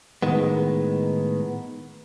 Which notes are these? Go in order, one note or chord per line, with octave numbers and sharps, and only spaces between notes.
A2 D#3 G#3 B3